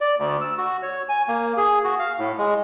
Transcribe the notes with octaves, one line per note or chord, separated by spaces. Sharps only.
D5
D2
E6
F#4
C#5
G#5
A#3
G#4
F#4
F5
A2
G#3